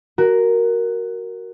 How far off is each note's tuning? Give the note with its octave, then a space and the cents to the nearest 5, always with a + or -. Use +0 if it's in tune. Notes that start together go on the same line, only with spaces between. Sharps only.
F#4 +10 A#4 +0